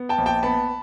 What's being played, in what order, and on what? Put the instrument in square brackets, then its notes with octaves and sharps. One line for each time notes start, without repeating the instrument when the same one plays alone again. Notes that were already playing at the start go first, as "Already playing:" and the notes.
Already playing: [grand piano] B3
G5 A5
A#1
G5 A5
B3 A5 B5